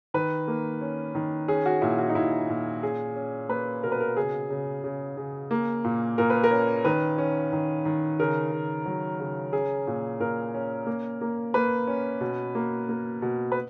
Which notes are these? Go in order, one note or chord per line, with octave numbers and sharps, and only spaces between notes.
D#3 B4
A#3
C#4
D#3
C#4 G#4
F#4
A#2 E4
F#4
D#4
A#2 E4
A#2
C#4 G#4
C#4
A#3 B4
B2 A#4
B4
A#4
C#3 G#4
C#3
C#3
C#3
A#3
A#2
A#2 A#4
B4
A#4
C#4
D#3 B4
C#4
D#3
D#3
C#3 A#4
C#3
F#3
C#3
C#4 G#4
A#2
A#2 A#4
C#4
A#3
A#3
A#3 B4
C#4
B2
A#3
A#3
B2
B4